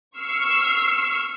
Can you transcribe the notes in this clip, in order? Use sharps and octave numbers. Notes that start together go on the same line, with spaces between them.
C#6 E6 F6 C7